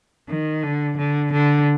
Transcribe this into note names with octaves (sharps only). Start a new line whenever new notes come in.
D#3
D3
D3
D3